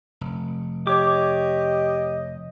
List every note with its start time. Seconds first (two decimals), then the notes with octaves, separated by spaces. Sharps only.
0.21 F1
0.87 G4 C#5 D#5 D6